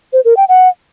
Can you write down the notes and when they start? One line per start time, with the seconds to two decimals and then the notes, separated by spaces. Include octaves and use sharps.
0.13 C5
0.25 A#4
0.37 G5
0.49 F#5